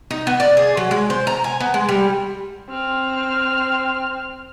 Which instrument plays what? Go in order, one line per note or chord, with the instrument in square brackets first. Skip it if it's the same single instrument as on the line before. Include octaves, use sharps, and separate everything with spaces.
[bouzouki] D#4
B3
D5
G#4
F#3
G#3
C5
A#5
G#5
B3
G#3
G3
[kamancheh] C4 F6